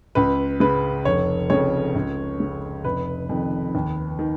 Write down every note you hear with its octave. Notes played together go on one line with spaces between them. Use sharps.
C#2 B4
C#3 B4
F1 C#5
F2 C#3 C#5
C#2
C#3
F1 B4
F2 D#3
D#2
D#3